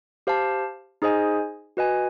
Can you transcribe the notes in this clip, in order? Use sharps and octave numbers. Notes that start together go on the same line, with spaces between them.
G4 C5 F5 A5
D#4 G#4 C5 D#5 G#5
F#4 B4 D#5 G#5